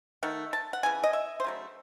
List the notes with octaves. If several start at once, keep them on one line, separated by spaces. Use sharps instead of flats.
D#3 A3 F#5
A5
F#5
C#3 E3 G#5
D#5
E5
C5
C#3 F#3 A3